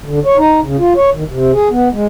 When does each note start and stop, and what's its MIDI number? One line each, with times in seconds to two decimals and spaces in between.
0.06 0.19 50
0.25 0.37 73
0.37 0.60 63
0.63 0.77 49
0.79 0.93 65
0.96 1.10 73
1.15 1.24 51
1.29 1.52 48
1.53 1.69 68
1.70 1.89 59
1.93 2.07 56